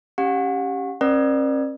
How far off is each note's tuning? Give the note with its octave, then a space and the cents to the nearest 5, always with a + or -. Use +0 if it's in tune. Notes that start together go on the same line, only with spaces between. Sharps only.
C#4 +0 G4 +0 F#5 -40
C#4 -45 A#4 +45 D5 +30